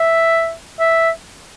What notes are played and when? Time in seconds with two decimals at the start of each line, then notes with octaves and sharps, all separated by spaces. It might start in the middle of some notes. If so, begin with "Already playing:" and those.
Already playing: E5
0.80 E5